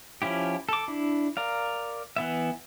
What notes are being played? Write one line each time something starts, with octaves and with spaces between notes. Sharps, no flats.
F3 C#4 E4 G4
A4 D6
D4 E4
A#4 D5 F5
E3 B3 E5